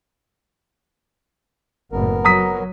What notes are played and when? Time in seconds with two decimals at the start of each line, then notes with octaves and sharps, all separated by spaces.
1.92 F#1 A2 B3 A#4
2.25 F#3 A#5 D#6 B6